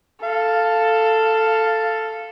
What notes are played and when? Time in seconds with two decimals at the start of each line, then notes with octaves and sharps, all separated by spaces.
0.23 A4 F5